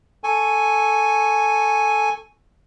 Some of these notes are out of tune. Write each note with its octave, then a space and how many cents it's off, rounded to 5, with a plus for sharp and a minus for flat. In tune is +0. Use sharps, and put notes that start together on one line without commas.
A4 +0 G#5 +0 C#6 +0